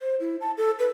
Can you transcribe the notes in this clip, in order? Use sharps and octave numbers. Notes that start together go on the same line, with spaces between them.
C5
E4
A5
A4
B4